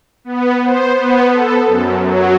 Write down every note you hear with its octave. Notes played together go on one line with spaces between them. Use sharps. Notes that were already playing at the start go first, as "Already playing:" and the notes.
B3
C5
B3
A4
F#2
F#3